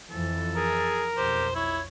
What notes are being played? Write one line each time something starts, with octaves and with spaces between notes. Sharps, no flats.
F2 E3 F3 A4
G#4 A#4
B1 F2 G4 C5
E4 C#5